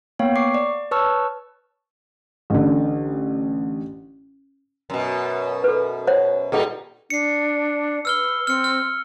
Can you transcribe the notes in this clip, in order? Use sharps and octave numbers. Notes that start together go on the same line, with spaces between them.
A#3 B3 C#5 F5 G5
C#6 D6 C7
D5
B4 C#5 A5 C#6 E6 F6
A1 D3
F#2 B2
A4 B4
C5 C#5 F#5
A#2 G3 D#4 G#4 A4 F#5
D4 C7 C#7
B4 E6 F6 G7
C4 F6 C#7
F6